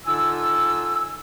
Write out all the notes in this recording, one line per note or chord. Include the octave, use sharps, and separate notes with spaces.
D3 D#4 F4 G#5 E6